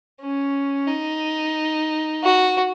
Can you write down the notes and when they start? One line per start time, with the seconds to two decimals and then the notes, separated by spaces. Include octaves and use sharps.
0.21 C#4
0.88 D#4
2.23 F#4